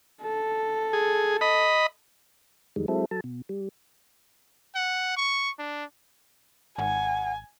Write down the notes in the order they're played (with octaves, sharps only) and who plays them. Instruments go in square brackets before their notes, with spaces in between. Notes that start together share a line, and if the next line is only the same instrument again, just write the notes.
[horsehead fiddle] A4
[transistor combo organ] G#4
D#5 B5
[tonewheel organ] F2 D#3 G3 G#3
F#3 G#3 C4 E4 A4
F#3 A4 A5
B2
G3
[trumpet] F#5
C#6
D4
[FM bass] G#1 [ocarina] F#5 [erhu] G#5